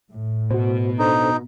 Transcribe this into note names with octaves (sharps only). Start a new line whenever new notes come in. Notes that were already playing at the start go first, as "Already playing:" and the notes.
A2
B2 F#4 C5
D4 D#4 A4 C5